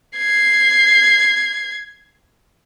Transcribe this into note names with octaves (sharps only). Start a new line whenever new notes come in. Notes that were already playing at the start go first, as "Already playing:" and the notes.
G#6 C7